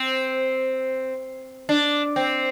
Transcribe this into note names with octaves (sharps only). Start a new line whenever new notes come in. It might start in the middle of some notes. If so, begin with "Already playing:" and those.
Already playing: C4
D4
C4